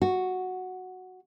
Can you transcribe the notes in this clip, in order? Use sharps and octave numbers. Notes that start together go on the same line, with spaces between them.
F#4